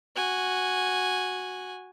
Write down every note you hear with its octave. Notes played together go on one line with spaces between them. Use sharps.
F#4 G#5